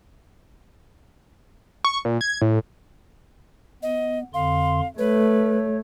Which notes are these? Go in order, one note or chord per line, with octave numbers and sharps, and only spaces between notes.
C#6
A#2
G#6
A2
B3 D#5
F2 D3 F5 C6
A3 B4 C#5